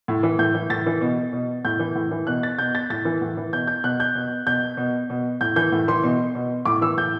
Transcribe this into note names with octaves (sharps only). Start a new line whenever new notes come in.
A2
E3
A2 G6
E3
A2 A6
E3
B2
B2
A2 G6
E3
A2
E3
B2 F#6
A6
B2 G6
A6
A2 A6
E3
A2
E3
B2 G6
G6
B2 F#6
G6
B2
B2 G6
B2
B2
A2 G6
E3 G6
A2
E3 C6
B2
B2
A2 D6
E3 E6
A2 G6